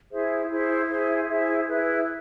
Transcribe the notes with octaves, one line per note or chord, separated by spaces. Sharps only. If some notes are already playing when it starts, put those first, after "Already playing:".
E4 G#4 C5 E5
E4 G#4 C5 E5
E4 G#4 C5 E5
E4 G#4 C5 E5
E4 G#4 B4 E5